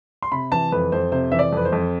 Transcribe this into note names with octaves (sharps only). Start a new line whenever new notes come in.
C6
C3 B5
E3 A5
F2 B4
F2 C5
C3 C5
E3 E5
D5
F2 B4
C5
F2